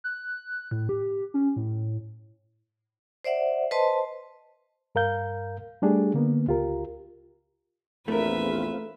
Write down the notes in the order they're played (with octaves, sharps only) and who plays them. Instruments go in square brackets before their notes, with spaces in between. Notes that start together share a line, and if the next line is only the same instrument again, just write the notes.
[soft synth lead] F#6
A2
G4
C#4
A2
[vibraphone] C5 D5 E5 F#5
B4 C5 D#5 A5 C6
[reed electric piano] G2 A#4 F5 G6
G3 A3 D4 G4 G#4
D3 A#3 B3
C#2 F4 G4 A#4
[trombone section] A#1 E2 [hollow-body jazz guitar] A3 A#4 [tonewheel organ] C4 F4 [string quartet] B4 E5